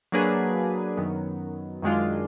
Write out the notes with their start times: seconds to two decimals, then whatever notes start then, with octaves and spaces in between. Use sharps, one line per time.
0.12 F#3 A#3 D4 G#4 B4
0.97 F#2 D#3 F#3 B3
1.82 F#2 D#3 G#3 D4 F4